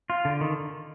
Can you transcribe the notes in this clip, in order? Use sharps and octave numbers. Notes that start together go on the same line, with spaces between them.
F4
D3
D#3